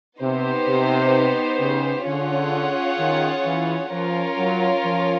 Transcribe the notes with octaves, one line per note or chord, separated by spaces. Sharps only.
C3 B3 D#4 G4 C5
C3
C#3
D3 C#4 F4 G#4 C#5 F#5
D#3
E3
F3 C#4 F4 A#4 C#5
F#3
F3